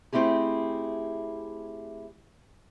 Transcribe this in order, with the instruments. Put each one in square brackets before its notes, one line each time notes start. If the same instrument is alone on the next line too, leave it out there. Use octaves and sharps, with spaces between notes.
[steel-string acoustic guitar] A3 C4 E4 G4 G#4